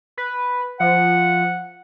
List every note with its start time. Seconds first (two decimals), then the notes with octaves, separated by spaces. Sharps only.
0.17 B4
0.80 F3 F#5